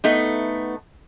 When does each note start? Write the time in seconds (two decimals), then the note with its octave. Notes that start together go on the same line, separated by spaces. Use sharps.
0.04 A3 B3 D#4